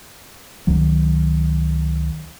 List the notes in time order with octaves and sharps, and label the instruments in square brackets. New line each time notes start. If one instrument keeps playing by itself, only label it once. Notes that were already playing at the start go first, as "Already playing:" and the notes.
[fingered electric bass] C#2 D#3 F#3